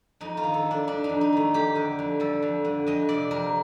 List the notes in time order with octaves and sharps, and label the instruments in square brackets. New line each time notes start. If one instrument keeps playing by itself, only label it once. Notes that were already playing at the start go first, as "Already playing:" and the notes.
[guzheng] F2 D#4
F4
D#3
A4
F2
D4
G3 D4
D#4
F2
D#4
D#3 A3
F2 G4
D3
F2
G3 A4
F2
D3
F2 D#5
C3 D5
F2 A#4